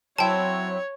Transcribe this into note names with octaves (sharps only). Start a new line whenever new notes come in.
F#3 C4 E4 C#5 G5 A5